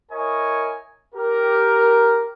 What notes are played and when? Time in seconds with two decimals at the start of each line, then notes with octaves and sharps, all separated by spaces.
0.12 E4 A#4 C#5 D#5 G#5 C#6
1.15 G4 A#4